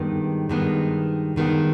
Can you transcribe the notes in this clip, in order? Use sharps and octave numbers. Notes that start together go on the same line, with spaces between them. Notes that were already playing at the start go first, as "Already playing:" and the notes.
Already playing: G2 D#3 G#3 B3
G2 D#3 G#3 B3
G2 D#3 G#3 B3